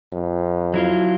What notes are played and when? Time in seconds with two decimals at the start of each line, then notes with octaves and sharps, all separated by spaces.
0.13 F2
0.74 F#3 E4 F4